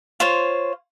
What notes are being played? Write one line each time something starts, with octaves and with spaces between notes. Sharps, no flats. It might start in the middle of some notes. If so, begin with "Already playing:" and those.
F4 C5 C#5